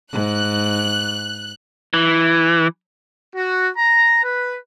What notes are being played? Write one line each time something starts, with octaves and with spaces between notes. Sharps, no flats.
G#2 F#6
E3
F#4
A#5
B4